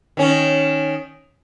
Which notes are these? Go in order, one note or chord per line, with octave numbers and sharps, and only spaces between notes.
D#3 C#4